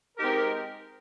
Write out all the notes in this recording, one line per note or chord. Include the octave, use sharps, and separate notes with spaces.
G#3 C4 D#4 G4 A#4